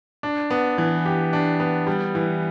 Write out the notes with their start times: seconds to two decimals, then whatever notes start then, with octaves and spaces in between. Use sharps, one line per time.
0.23 D4
0.50 B3
0.78 E3
1.06 G4
1.33 D4
1.60 B3
1.87 G3
2.15 E3